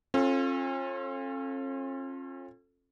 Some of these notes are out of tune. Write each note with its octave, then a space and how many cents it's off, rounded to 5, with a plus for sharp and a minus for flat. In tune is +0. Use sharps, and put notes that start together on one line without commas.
C#4 -45 F4 +10 A4 +0